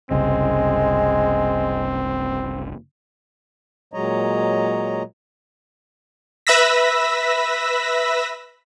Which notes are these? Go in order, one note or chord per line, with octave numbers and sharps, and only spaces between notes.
F#1 C2 C#3 G#3 C4
A#2 F#3 G#3 C#5 D#5 A#5
B4 E5 B5 E6 A#6 B6